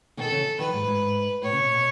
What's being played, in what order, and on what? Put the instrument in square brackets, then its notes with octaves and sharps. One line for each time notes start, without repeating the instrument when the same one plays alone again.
[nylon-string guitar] B2 D#3 [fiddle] A4
[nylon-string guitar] C#3 E3
[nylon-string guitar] D#3 F#3 [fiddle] B4
[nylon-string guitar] G#2
G#2
[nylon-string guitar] A2 [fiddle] C#5
[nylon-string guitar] C#3
B2
B2